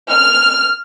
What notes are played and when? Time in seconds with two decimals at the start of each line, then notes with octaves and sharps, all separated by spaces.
0.10 F6